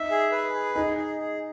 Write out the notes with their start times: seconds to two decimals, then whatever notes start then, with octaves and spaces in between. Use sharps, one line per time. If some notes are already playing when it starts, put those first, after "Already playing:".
Already playing: D#4 E5
0.10 G#4
0.32 B4
0.53 G#4
0.75 D#4 G#4
0.97 G#4
1.18 G#4